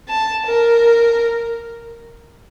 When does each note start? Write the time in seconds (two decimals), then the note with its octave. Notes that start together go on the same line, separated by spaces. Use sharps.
0.09 A5
0.46 A#4